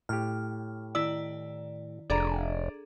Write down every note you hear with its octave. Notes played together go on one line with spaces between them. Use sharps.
A2 G4 F6
D#3 E4 D5 E6
F1 D4 G#4 A4 D5 A#5